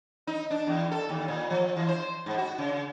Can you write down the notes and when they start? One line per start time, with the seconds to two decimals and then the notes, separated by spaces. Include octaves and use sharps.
0.27 D#4
0.51 D4
0.67 E2
0.91 A4
1.09 D#2
1.28 A#2
1.50 F3
1.76 E3
1.88 C5
2.26 G#2
2.38 F#4
2.58 C#3